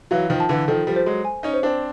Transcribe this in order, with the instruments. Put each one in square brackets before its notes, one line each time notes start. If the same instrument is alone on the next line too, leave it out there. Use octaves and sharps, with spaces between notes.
[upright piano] E3 F#3 [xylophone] F5
[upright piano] D#3 F3
[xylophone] A5
[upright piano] D3 E3
[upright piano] D#3 F3 [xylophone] A4
[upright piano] F3 G3
[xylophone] C5
[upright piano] F#3 G#3
[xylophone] G#5
[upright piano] C#4 D#4
[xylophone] C5
[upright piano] C4 D4